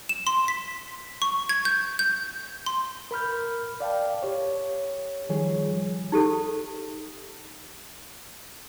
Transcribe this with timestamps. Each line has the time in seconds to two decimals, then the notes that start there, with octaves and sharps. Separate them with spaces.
0.09 E7
0.27 C6
0.48 B6
1.22 C#6
1.49 G#6
1.65 G6
1.99 G6
2.66 C6
3.11 A#4 B5 F6 G6
3.80 D5 F5 G5 A5
4.23 G4 C#5
5.29 D#3 F3 G3 G#4 C#5
6.12 D#4 G4 A4